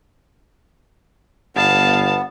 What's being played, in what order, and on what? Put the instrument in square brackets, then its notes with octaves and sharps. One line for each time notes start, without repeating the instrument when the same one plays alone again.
[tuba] G1 [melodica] B3 [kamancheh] F5 A5